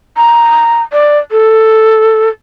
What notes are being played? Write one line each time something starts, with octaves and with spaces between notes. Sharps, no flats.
A#5
D5
A4